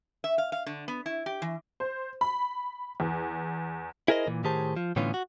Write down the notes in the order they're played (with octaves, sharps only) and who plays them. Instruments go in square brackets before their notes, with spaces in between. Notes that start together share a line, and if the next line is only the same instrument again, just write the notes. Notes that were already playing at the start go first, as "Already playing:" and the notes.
[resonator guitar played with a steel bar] E5
F5
F5
D3
B3
E4
G4
E3
[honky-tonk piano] C5
B5
E2
[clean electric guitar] E4 G#4 A#4 C5 D#5
A#2 E3
A2 D#3 G4 G#4 C5 A5
F3
A2 D3 E3 B3 C#4 F4
F#4